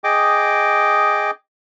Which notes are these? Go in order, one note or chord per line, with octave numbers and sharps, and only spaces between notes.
G#4 D#5 G5 D6